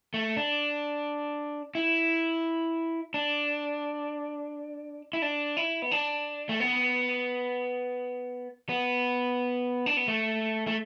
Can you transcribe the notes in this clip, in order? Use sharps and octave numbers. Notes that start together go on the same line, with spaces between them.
A3
D4
E4
D4
E4
D4
E4
B3
D4
A3
B3
B3
D4
B3
A3
A3